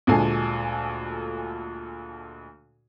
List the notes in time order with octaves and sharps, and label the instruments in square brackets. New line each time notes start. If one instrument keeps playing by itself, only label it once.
[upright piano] D2 A#2 G#3 A4 G#5 C7